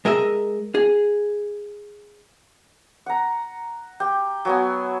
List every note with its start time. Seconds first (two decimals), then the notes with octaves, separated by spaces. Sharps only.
0.05 G#3 A#4 D#5 E5
0.75 G#4
3.06 F#5 A#5
4.00 G4 G5
4.45 F#3 B3 G#5